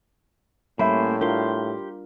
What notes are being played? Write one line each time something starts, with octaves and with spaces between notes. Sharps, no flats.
A2 G3 A#3 C#4 C5 E5 B5
D4 F4 G4 A#4 C6